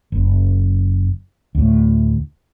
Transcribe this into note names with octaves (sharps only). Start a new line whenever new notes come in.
F#1
D2 A2